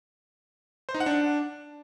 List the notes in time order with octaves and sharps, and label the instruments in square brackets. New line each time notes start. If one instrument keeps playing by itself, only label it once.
[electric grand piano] C5
D#4
F#5
D4